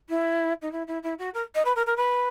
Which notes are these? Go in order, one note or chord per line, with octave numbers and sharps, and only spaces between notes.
E4
D#4
E4
E4
E4
F#4
A#4
D#5
B4
A#4
A#4
B4